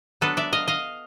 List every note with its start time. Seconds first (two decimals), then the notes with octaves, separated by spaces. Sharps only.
0.21 F#3 B3 D4 A4 B4
0.37 D5 E5
0.53 D#5 F5
0.68 D#5 F5